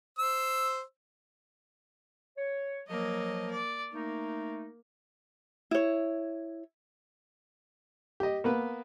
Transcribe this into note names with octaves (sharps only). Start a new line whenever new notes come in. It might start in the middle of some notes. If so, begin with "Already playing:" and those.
C5 E6
C#5
F3 F#3 A#3 D#5
D5
A3 A#3 D#4
E4 C#5
G4 D#5
A#3 B3 B4